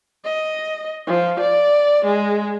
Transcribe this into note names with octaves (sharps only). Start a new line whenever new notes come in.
D#5
F3
D5
G#3